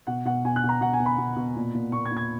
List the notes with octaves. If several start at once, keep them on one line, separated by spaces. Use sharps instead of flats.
B2 F#5
B2 F#5
B2 G#5
F#6
B2
A#5
B2 F#5
G#5
B2
B5
B2
B2
A#2
A#2
A#2 C#6
G#6
A#2
G#6